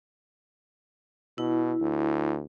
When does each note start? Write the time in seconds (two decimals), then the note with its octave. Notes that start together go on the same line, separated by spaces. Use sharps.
1.38 B2 E4
1.81 D2